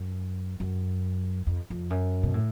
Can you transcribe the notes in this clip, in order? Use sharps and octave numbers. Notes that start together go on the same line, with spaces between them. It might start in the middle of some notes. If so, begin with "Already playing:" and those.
Already playing: F#2
F#2
F2
F2
F#2
B2
A2